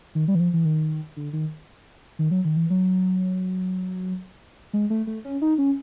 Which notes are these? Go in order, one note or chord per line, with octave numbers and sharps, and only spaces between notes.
D#3
G3
E3
F3
E3
D#3
D3
D#3
D#3
F#3
D#3
E3
F#3
G#3
A3
A3
C#4
D#4
C#4